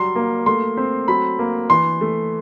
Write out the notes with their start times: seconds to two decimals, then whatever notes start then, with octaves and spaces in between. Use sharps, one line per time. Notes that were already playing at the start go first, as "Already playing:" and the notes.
Already playing: F#3 G3 C6
0.16 A#3
0.46 A3 C6
0.77 C4
1.08 F#3 B5
1.39 A#3
1.70 E3 C6
2.01 A3